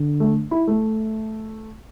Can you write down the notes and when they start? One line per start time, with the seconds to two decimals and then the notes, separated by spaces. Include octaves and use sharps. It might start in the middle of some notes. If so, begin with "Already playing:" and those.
Already playing: D3
0.20 A3
0.51 E4
0.67 A3